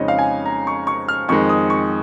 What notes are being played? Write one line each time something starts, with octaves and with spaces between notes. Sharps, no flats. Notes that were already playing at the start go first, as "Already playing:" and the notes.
Already playing: F2 C#3 G#3 D#4 C#5 D#5
F5
G#5
A#5
C#6
C#6
F6
F2 D#3 G#3 C#6
D#6
C#6